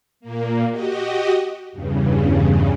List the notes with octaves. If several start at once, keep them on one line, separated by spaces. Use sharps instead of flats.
A#2 A#3
F#4 G4 D#5
E2 G2 C#3